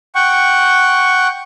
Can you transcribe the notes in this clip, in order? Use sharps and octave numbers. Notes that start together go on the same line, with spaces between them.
F#5 G5 C#6